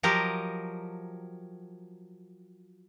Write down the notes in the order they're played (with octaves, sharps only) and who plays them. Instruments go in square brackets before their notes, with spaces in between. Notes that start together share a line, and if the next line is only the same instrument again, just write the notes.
[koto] F3 F#3 G4 A#4 D#5